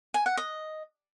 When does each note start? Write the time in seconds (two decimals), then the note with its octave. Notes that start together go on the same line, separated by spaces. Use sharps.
0.14 G#5
0.26 F#5
0.37 D#5